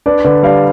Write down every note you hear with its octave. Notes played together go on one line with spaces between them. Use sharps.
D4 B4 D5
D3 B4 D5
G3 D5 F5